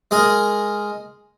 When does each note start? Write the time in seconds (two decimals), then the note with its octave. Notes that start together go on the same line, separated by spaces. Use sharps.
0.11 G#3 G#4 A#4